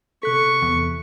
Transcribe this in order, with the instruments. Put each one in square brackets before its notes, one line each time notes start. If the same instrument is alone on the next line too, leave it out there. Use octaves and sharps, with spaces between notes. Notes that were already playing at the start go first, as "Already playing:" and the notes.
[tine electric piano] C3 F#6 B6 [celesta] A4 [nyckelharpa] C#6
[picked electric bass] E2